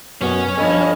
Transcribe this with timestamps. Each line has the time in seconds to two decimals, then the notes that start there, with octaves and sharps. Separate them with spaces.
0.21 F#2 B2 B3 C#4
0.58 G2 F3 A4 D#5 G#5 B5